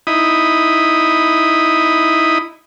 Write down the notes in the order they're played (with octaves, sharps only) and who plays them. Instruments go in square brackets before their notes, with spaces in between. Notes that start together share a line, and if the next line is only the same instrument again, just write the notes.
[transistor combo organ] D#4 E4 B5 D#6